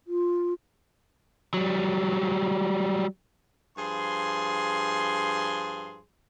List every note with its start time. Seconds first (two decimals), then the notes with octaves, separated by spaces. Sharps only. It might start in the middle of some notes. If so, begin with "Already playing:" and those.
0.07 F4
1.54 F#3 G3
3.78 G2 F3 G#4 C6